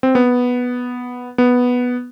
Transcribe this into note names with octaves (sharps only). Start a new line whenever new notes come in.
C4
B3
B3